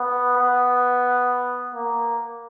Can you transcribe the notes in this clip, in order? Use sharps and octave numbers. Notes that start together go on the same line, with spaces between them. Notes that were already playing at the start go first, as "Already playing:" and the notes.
Already playing: B3
B3
A#3